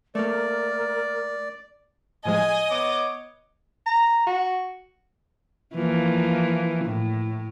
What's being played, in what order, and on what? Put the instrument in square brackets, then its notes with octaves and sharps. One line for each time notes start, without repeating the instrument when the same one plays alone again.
[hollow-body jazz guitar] A3 A#3 [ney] A#4 [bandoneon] D5
[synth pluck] A2 F3 G#3 [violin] D#5 [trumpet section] G#5
[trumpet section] B3 C#5 D6
[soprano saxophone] A#5
F#4
[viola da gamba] E3 F3 A#3
A2